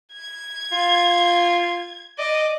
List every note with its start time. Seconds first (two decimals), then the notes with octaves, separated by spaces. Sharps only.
0.13 G#6
0.72 F4
2.18 D5 D#5